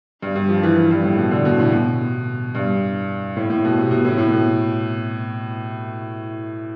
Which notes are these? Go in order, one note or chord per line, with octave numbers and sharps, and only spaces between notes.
G2
G2
F3
E3
E3
G2
A2
B2
D3
B2
A2
B2
G2
A2
A2
B2
C3
B2
A2
A2
B2